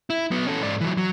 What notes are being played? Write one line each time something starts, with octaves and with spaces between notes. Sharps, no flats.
E4
F#3 B3
C#4 A4
G#2 D5
E3 F#3
F#3